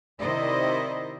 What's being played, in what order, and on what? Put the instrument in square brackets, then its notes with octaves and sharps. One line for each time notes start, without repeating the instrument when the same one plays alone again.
[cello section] C3 D#3 E4 C5 D5 D#5